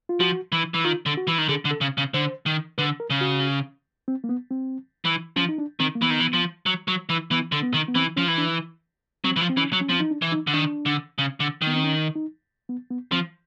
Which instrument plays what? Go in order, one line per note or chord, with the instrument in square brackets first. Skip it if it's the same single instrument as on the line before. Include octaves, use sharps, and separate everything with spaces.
[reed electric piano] F4
[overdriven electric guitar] F3 [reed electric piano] F#4
[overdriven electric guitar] E3
E3
[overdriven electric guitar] D#3 [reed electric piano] F4
[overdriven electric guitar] D3
[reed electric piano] F#4
[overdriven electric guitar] E3
D#3
[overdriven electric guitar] D3 [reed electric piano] G#4
[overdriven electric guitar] D3
[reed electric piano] A4
[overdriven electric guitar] C#3
C#3
[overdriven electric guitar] D3 [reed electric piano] C5
[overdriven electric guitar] D#3
[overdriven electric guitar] D3 [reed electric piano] B4
[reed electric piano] A#4
[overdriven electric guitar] C#3
[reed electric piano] F#4
C4
A#3
B3
C4
[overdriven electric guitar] E3
[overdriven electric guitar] F3 [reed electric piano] C#4
[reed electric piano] D#4
D4
[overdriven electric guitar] D#3 [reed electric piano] C4
[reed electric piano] A#3
[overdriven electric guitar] E3 [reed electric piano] B3
[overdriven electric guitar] D#3
E3
F3
F#3
F#3
E3
[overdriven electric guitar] E3 [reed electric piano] B3
[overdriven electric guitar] D3
[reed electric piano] B3
[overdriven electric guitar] D#3
[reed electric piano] B3
[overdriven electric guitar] E3 [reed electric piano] C4
[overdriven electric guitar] F3 [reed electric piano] C#4
[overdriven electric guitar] E3
[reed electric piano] D4
[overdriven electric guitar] F#3 [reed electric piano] C4
[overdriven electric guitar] E3
F3
[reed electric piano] C4
[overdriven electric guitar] E3 [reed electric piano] C#4
[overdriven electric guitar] F#3
[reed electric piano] C#4
[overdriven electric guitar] F3 [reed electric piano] C4
[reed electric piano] D#4
D4
[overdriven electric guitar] E3
[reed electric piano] D#4
[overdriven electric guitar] D3
[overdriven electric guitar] D#3 [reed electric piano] D4
[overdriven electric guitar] D3
C#3
D3
D#3
[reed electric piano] B3
C4
C#4
D#4
B3
B3
[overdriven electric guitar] F3 [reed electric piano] C4